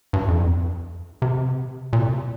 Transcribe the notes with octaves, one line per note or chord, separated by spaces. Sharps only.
G2
F2
C3
A#2
C3